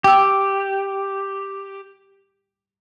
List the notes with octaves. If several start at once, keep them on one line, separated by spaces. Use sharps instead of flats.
G4 G5 E6